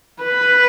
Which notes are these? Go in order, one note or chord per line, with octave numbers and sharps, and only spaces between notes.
B4